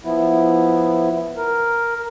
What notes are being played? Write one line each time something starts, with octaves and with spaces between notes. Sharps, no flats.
F3 B3 E4
A#4